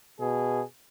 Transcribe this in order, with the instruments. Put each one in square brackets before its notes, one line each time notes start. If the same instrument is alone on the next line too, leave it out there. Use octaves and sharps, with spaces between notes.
[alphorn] B2 [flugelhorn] G#4